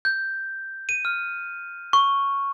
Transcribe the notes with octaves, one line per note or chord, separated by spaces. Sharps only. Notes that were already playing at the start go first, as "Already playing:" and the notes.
G6
D#7
F6
C#6